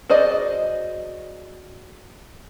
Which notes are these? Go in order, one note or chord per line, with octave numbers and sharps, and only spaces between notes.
F#4 G#4 C5 D5 D#5